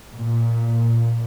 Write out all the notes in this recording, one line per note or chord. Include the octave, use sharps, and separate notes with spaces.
A#2